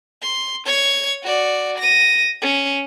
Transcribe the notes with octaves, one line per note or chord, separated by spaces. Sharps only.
C6
C#5 G#6
F#4 D5
A#6 D#7
C#4